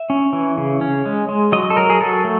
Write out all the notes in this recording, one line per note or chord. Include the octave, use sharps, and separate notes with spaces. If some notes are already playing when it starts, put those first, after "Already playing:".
Already playing: E5
C#4
E3
C#3
C#4
G#3
G#3
F#3 D#5
A4
F#3 A#4
G#4
F#3 A4
A3